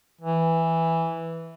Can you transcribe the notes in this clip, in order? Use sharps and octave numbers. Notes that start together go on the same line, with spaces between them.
E3